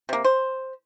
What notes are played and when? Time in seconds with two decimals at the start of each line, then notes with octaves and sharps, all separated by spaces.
0.09 C3 A#3
0.24 C5